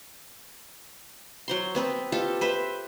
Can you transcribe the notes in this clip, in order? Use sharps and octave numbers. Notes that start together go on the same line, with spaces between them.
F#3 C5 C6
B3 C4 B4
F4 G4 A4
B4 C5 E5